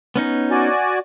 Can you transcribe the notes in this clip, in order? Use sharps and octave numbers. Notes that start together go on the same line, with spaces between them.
B3 C#4 D#4
F#4 D5 G#5